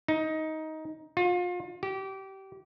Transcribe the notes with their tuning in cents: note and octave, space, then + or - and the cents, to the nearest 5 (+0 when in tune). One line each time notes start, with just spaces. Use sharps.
D#4 +15
F4 +35
G4 -25